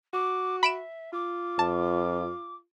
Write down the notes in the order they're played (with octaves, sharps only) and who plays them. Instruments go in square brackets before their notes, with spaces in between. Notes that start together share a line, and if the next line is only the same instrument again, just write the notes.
[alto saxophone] F#4 [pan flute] D6
[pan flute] E5 [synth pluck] B5 D7 E7
[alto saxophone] F4 [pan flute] D6
[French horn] F2 [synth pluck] A5